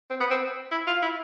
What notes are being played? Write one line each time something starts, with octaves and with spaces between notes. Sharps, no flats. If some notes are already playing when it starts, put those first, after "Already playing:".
C4
B3
C4
E4
F4
E4